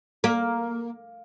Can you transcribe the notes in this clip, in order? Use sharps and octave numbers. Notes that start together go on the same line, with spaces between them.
A#3